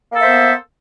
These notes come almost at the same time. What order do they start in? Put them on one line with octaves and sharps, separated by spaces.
A#3 A4 E5 C5 B3